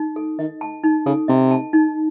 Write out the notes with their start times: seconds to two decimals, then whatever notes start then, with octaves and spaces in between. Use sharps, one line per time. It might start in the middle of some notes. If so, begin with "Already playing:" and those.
Already playing: D#4
0.16 A4
0.39 D#3 D#5
0.61 A5
0.83 D#4
1.06 C#3 A4
1.28 C3 D#5
1.51 A5
1.73 D#4